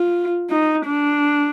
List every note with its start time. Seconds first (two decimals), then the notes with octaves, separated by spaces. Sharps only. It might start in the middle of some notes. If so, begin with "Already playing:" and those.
Already playing: F4
0.50 D#4
0.85 D4